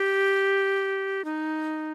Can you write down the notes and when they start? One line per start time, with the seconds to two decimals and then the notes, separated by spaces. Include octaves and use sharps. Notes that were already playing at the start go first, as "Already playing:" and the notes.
Already playing: G4
1.25 D#4